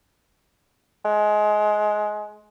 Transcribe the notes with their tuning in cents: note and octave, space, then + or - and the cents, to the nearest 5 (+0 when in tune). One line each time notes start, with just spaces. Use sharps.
G#3 +20